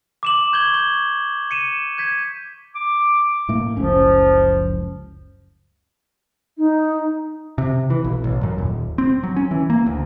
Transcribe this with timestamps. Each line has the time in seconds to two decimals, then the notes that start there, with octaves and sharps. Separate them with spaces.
0.23 D6 E7 F#7
0.53 C#6 G6 G#6 G7
0.74 C#6 G7
1.51 C#7 D#7 E7
1.98 G6 G#6 B6
2.75 D6
3.49 A2 A3 A#3
3.77 F#1 C#2 F3 C#4
6.57 D#4
7.58 C3
7.90 E3
8.04 B1
8.24 A1
8.43 F#2
8.58 D#1
8.98 C4
9.23 F#3
9.36 C#4
9.51 E3
9.70 A#3
9.86 D2